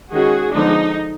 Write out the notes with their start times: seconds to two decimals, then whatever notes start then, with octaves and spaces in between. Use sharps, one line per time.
0.12 D#3 G#3 C#4 F#4 G#4
0.53 D3 F3 G#3 B3 D4 D#4